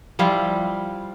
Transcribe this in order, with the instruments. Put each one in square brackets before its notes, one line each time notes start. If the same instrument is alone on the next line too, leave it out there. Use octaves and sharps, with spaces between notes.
[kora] F3 G3 E4 F4